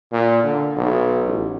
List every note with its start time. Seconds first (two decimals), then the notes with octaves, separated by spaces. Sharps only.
0.12 A#2
0.44 D3
0.76 B1
1.26 A1